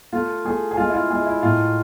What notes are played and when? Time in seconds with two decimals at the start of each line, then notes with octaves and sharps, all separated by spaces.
0.13 A3 F4
0.45 A3 G#4
0.71 G#4
0.77 G#3 F4
0.90 E4
0.94 F4
1.10 G#3 G#4
1.26 E4
1.42 A2 F4